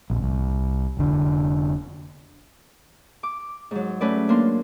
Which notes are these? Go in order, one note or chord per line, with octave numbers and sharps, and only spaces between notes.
A#1 F2
C2
F1 D3
D6
G#2 F#3
A3 C#4 B4 D5
A#3 D4 C6